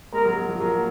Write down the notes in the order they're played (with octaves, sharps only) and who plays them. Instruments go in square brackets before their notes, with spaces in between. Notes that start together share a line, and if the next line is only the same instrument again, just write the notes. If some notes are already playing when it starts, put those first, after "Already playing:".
[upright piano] G#3 [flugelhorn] A#4
[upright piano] F#3
F#3
F3
[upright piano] F#3 [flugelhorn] A#4
[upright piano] A#3